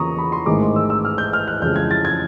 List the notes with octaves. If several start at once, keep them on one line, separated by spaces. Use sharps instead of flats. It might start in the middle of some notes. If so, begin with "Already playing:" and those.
Already playing: E2 C#3 F3 A#3 A#5 C#6 D#6
B5
C6
A1 G#2 D#3 G#3 D6
E6
E6
F6
G6
F6
F#6
F2 C#3 E3 G#3 G6
G#6
A6
G#6